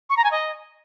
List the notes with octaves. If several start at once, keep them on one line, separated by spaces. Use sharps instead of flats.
C#6
A#5
G#5
D#5